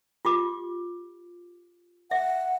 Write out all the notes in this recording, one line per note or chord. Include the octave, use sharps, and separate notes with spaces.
F4 G4 D6
E5 F#5